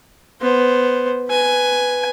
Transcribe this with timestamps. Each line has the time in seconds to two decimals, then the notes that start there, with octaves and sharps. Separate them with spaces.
0.41 B3 C5
1.28 B4 G#5